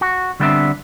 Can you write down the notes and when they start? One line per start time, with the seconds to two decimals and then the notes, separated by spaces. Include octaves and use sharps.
0.01 F#4
0.40 D3 G3 B3 C4 D4 E5